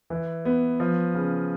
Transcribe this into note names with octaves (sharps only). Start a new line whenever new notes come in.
E3
B3
F3
C#3